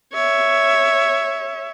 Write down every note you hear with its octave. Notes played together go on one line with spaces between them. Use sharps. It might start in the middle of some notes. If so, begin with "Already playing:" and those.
C#5 E5